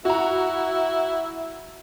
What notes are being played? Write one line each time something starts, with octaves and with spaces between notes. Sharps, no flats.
E4 F#4 A#5